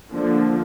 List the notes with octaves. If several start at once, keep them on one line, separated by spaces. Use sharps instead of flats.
D3 F3 A#3